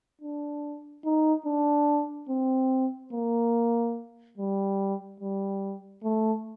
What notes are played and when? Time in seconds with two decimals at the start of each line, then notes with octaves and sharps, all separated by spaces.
0.22 D4
1.05 D#4
1.46 D4
2.29 C4
3.13 A#3
4.38 G3
5.20 G3
6.03 A3